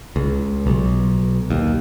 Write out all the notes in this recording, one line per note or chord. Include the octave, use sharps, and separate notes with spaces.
C#2
B1
D#2